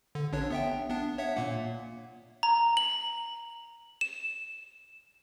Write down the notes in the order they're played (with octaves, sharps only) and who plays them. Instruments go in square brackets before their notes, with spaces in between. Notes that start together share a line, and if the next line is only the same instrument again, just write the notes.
[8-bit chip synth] D3
A1 D4 C#5
B3 E5 G5
B3 D4
C#5 E5 F#5
A#2 A#3 F#5
[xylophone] A#5
F#7
E7